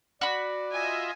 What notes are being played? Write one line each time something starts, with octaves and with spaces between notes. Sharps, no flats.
F#4 D5 B5
F4 D#5 E5 G#5